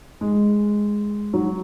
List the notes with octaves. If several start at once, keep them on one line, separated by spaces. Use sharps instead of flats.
G#3
F#3